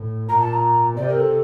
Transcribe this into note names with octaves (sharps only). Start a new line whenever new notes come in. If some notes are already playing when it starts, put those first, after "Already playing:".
Already playing: A2
A#2 A#5
A5
A#5
C3 D5
A#4
A4